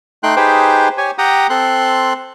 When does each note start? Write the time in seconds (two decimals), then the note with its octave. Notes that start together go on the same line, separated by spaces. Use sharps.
0.23 A3 D#4 G5 C6 F#6
0.36 D#4 G4 G#4 B4 C5 G5
0.98 G4 C#5 G#5
1.18 G4 F#5 G5 A#5 D#6
1.50 C4 A4 C6 F#6